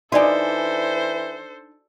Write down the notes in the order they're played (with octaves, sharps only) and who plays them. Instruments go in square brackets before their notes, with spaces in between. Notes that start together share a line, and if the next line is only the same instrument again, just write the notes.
[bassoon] E3 [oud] D4 D#4 [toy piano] F#4 D5 G#5 [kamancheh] A4 C5